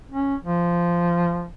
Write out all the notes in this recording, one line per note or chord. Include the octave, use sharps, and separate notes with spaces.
C#4
F3